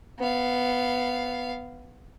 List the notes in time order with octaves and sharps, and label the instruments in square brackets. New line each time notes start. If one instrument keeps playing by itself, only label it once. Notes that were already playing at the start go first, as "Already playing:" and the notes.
[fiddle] B3 F5